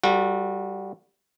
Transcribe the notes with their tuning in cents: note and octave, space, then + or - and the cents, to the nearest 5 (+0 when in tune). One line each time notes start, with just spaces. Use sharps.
G3 -10 F#4 -30 A4 +25